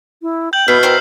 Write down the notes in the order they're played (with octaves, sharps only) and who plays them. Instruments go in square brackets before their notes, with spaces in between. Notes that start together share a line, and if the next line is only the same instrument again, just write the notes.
[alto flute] E4
[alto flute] G5 [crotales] G6 F#7
[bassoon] B2 [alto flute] B3 [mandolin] E4 [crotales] F6 C7
[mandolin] E4 A#4 C5 [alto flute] G5